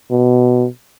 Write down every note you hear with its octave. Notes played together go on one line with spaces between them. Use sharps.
B2